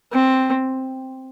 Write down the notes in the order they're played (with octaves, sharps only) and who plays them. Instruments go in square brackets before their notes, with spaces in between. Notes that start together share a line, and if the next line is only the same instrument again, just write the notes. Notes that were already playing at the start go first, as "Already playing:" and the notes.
[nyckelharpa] C4